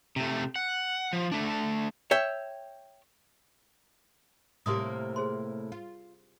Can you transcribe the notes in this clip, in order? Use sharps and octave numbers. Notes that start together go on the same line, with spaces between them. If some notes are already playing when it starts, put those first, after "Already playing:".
C3 A3
F#5
F3
A3 D4
C#5 E5 G5
A2 C3 A#3 G4 C6 D#6
G#4 C5 C6
F4